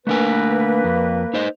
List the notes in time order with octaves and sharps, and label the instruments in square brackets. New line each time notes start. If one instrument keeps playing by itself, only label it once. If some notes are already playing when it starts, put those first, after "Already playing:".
[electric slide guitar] A3 D4 G#5 [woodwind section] A#3 B4
[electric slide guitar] F2
D#4 C5 D#5